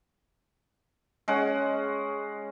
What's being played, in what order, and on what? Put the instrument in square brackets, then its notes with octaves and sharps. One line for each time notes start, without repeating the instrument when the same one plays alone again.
[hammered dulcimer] G#3 C#4 F#5